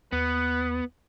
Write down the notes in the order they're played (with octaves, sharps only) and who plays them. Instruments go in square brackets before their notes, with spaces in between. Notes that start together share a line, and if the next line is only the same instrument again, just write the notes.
[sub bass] D#2 [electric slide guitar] B3 [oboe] B4